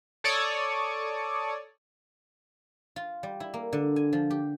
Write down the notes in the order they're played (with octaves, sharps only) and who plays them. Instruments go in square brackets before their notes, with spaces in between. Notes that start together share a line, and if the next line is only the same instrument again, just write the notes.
[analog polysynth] A4 C#5 D5 C#6 D#6
[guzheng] F4
G3
E4
A#3
D3
G#5
F3
G4